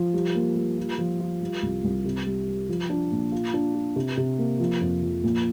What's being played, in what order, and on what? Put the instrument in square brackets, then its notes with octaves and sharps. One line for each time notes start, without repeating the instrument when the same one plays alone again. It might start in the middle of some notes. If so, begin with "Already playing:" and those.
Already playing: [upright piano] F3
G3
A#3
G3
F4
F3
F4
G3
C2
C2
C3
G3
G3
F3
D4
A#2
F4
D4
F4
C3
C3
A#3
F3
F2
F3
A#2